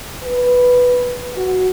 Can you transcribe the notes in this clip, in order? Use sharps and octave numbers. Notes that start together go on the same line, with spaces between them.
B4
F#4